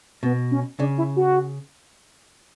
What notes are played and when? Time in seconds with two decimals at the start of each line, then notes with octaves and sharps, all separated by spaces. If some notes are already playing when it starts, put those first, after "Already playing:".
0.23 B2 B3
0.51 C#4
0.79 C#3 D4
0.98 E4
1.16 F#4